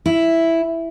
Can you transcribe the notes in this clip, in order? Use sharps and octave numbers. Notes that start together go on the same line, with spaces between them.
E4